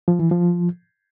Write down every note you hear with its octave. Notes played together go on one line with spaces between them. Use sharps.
F3
E3
F3